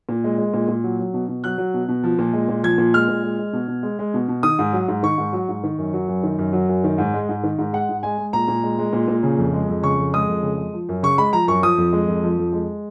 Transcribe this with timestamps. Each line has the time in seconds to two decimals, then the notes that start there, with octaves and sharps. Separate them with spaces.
0.09 A#2
0.24 G#3
0.38 G#3
0.54 A#2
0.68 A#2
0.84 F#3
0.99 F#3
1.14 B2
1.28 B2
1.44 F#3 F#6
1.58 F#3
1.74 B2
1.89 B2
2.04 F3
2.19 A#2
2.33 G#3
2.49 A#2
2.63 F3 G#6
2.78 A#2
2.94 G#3 F6
3.09 A#2
3.24 G#3
3.39 G#3
3.53 B2
3.68 B2
3.83 G#3
3.99 G#3
4.14 B2
4.28 B2
4.43 D#3 D#6
4.59 G#2
4.73 F#3
4.88 G#2
5.03 D#3 C#6
5.18 G#2
5.33 F#3
5.49 G#2
5.64 D#3
5.78 F#2
5.93 F#3
6.08 F#2
6.23 D#3
6.38 F#2
6.53 F#3
6.69 F#2
6.84 D#3
6.98 G#2
7.14 G#3
7.29 G#2
7.44 D#3
7.59 G#2
7.73 G#3 F#5
7.89 G#2
8.03 G#3 G#5
8.18 G#3
8.33 A#2 A#5
8.48 A#2
8.63 G#3
8.79 G#3
8.93 A#2
9.08 A#2
9.23 C#3
9.38 F2
9.53 G#3
9.68 F2
9.83 C#3 C#6
9.98 F2
10.13 G#3 D#6
10.28 F2
10.43 C#3
10.58 G#3
10.74 F3
10.89 F#2
11.03 C#3 C#6
11.18 G#3 B5
11.33 F3 A#5
11.48 F#2 C#6
11.63 F3 D#6
11.78 F2
11.93 G#3
12.08 F2
12.23 F3
12.39 F2
12.53 G#3